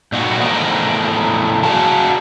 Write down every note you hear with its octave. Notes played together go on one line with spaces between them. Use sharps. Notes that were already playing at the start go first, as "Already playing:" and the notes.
A#2 D#4 F#4
E2 A2 F3 A#4 D#5
F#4 G#4 A#4 F5 F#5 A5